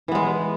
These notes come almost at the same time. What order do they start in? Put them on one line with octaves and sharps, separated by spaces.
E3 B3 G#3